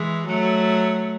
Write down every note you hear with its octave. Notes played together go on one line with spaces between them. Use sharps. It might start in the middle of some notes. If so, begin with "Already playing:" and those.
Already playing: E3 G#3
F#3 A3